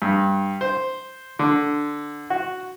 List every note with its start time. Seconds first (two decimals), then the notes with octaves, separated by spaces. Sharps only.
0.02 G2
0.61 C5
1.39 D3
2.30 F#4